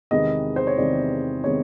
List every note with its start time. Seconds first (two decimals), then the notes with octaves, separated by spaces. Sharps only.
0.11 E2 C3 D#3 G#3 B3 D#5
0.56 C5
0.67 C#5
0.78 E2 C3 D#3 G#3 B3 D5
1.44 C3 D#3 G#3 B3 C#5